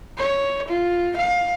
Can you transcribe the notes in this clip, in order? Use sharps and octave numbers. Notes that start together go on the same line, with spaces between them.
C#5
F4
F5